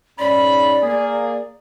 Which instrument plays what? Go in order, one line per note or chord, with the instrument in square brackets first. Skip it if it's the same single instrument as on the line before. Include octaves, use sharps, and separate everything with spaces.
[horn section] G#2 C#4 B5 [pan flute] D5
[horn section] A#3 G#4